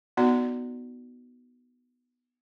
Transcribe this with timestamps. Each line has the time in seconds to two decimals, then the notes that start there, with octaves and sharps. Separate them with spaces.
0.17 B3 D#4 F#4 D5